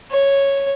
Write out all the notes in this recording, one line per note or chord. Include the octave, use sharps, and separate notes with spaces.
C#5